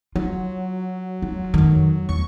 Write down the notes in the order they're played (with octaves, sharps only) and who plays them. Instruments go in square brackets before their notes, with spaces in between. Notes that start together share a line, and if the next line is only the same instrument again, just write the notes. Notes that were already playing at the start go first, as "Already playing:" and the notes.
[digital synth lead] F#3 [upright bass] F4
[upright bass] F4
F2 D#3
[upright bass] E2 [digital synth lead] C#6